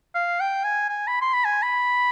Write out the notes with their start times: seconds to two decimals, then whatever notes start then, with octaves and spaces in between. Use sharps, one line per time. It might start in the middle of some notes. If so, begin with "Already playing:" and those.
0.15 F5
0.40 G5
0.64 G#5
0.89 G#5
1.07 B5
1.22 C6
1.33 B5
1.45 G#5
1.63 B5